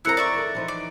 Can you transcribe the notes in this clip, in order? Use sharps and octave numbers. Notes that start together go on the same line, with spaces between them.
F2 E4 A#4 A#5 E6 F#6 C#7
D5 E5 C#6 A6
D#3 A4
E3 F3 D#4
D5